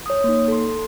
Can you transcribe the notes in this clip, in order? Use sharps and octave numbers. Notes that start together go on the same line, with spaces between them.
C#5 D#6
A#3 D#4
A4 C6